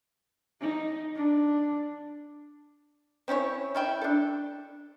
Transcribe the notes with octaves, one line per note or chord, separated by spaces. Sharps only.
D#4
D4
C4 C#4 E4 C#5
C#4 E4 G5
D4 A4